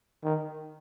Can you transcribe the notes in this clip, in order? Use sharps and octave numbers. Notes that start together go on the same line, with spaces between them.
D#3